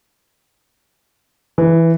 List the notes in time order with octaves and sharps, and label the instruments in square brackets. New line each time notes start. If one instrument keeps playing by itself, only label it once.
[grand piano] E3